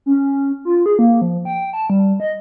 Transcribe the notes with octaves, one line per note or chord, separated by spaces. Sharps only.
C#4
F4
G#4
A#3
F3
G5
A5
G3
D#5